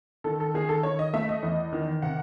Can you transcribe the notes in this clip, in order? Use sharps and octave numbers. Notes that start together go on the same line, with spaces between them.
D#3 A4
A4
D#3 G#4
A4
D#3 C#5
D#5
A3 E5
D#5
E2
D#3
C3 F#5